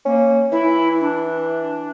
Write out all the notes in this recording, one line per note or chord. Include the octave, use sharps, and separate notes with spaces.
A#3 C#4
E3 E4
D4